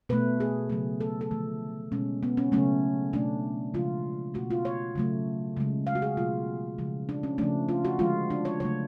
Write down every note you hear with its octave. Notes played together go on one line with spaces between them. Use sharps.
B2 A3 B4
G#4
C#3 F#3 A3
A4
A4
D3 F3 A3
B2 G#3 C#4
B3
C#4
C#3 F#3 A3 C#4
B2 A3 D4
C#3 F3 G#3 F4
B2 A3 F#4
F4
C#5
C#3 F#3 A3
C#3 G#3
F5
F#4
G#4
B2 F#3 A3 F4
C#3 F3 G#3
D4
C#4
C#3 F3 A3 D4
F4
F#4
D3 F3 G#3 F4
D4
C#5
C#3 F#3 A3 C#5